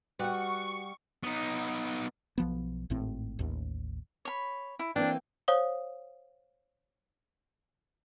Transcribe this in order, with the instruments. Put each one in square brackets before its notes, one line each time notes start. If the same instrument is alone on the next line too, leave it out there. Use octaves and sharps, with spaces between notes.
[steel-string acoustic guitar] G3 F#5 [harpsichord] F#4 B4 [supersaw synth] C#6
[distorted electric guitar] B3 D#4
[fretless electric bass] B1 F3 B3
G#1 A2 C4
A1 D#2
[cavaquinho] C#5 B5
E4
[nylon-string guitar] E3 A#3 C4 [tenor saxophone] D4 [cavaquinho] G5
[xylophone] C5 C#5 F5 D#6 G7